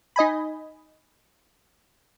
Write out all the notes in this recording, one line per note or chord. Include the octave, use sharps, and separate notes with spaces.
D#4 D#5 G#5 B5